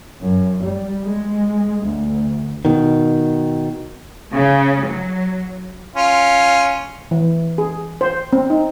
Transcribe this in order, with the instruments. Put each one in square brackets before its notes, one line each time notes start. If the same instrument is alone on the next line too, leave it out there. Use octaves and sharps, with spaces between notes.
[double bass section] F#2
G3
G#3
D2
[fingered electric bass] B2 D#3
[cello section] C#3
F#3
[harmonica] C#4 F4
[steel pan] E3
G#4
C5
C4
D#4